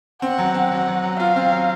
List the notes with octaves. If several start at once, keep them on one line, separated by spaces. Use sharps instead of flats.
C4 F#5
F#3
C4
F#3 F#5
F#3
F#3
F4 F5
C4
F#3